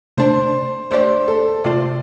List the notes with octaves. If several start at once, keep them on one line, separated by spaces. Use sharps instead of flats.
C3 A3 D4 C5
A3 D4 G4 C5 D5
A4
C3 A3 F4 C5 D5